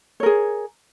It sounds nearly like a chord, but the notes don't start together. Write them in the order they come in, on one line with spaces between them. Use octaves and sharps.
C#5 A#4 G#4